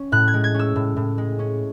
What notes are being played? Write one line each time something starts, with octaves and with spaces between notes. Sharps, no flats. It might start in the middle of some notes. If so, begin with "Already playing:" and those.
Already playing: C#4
A2 F#6
G#6
G#3
G#6
C#4
E6
A2
A2
G#3
C#4